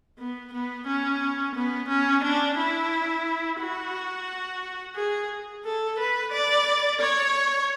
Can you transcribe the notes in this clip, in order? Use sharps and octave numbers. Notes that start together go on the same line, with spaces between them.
B3
B3
C#4
B3
C#4
D4
E4
F#4
G#4
A4
B4
D5
C#5